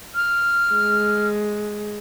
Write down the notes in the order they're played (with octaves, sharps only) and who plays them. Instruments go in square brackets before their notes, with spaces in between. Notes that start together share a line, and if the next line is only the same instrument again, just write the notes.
[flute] F6
[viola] G#3